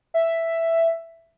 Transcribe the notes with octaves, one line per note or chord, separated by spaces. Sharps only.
E5